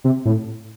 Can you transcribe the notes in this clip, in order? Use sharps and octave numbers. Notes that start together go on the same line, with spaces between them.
C3
A2